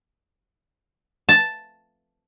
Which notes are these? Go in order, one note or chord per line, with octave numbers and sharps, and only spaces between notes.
A5